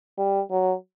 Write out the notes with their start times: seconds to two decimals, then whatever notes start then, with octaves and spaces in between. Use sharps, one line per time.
0.18 G3
0.51 F#3